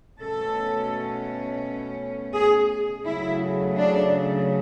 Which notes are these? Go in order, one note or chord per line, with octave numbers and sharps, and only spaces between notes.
B2 A3 C#4 A4
G#4
C#3 F#3 A3 E4
D4